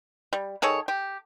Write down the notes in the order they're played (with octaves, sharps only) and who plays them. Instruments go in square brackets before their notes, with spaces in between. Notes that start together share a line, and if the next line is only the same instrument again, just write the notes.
[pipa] G3
D#3 G#4 A4 C#5
G4